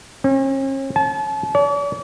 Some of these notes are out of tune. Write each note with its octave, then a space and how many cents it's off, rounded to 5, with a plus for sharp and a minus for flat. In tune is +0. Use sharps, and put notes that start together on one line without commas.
C#4 -45
A5 -35
D5 -45